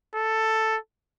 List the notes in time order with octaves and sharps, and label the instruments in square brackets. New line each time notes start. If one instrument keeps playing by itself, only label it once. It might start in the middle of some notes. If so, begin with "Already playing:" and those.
[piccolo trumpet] A4